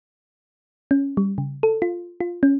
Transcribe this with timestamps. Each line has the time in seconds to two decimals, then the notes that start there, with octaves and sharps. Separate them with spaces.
0.91 C#4
1.17 G3
1.38 C#3
1.63 A4
1.82 F4
2.20 F4
2.43 C#4